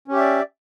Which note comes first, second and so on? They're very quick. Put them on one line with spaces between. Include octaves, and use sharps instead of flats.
C#4 G4 E5 D5